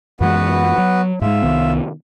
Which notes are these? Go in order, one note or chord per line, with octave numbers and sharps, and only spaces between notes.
F#2 E3 G#3 B3 F#4 B4
F#3
G#2 G#3 F4 E5
C2 D#3 B3